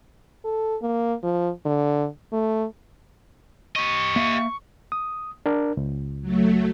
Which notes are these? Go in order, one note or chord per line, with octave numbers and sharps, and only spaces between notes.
A4
A#3
F3
D3
A3
G4 D#5 C#6
A#3 E5 F5
D#6
D4 A#4
C#2
F#3 A3